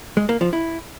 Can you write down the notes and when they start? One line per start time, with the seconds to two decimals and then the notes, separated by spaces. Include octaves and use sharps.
0.17 G#3
0.29 A#3
0.41 F3
0.53 E4